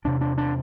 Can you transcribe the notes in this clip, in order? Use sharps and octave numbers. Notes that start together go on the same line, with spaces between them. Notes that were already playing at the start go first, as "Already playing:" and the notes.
E2 C3 D4
D4
D4